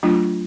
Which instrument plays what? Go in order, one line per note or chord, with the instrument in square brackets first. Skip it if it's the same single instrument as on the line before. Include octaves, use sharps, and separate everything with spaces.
[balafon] F#3 A3 D4 F4